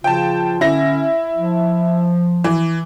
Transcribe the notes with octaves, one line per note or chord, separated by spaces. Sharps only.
C#3 F3 F4 G5 A5
D3 C#4 E4 A#6
F3
E3